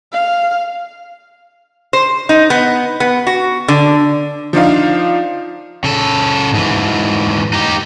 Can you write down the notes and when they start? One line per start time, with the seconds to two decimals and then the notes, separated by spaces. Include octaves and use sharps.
0.13 F5
1.93 C5
2.29 D#4
2.50 B3
3.00 B3
3.27 F#4
3.68 D3
4.53 F3 D4 D#4 F5
5.84 C#3 A4
6.54 G#2 E3
7.53 D#4 G4